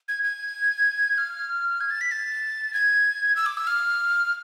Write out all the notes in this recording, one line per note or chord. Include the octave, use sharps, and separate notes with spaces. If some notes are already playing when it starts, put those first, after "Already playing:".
G#6
G#6
F6
G#6
A6
B6
A6
G#6
E6
D6
E6
F6